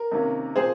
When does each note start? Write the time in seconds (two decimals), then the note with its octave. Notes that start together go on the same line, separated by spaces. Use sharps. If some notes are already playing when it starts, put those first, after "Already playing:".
Already playing: A#4
0.12 C3 D#3 A#3 C#4
0.55 A#2 F3 C4 G#4 C5